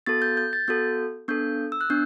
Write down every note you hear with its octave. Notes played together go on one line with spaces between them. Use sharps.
B3 F#4 A4 A6
G6
G6
A6
B3 F#4 A4 G6
B3 D4 A4 G6
E6
F#6
B3 D4 G6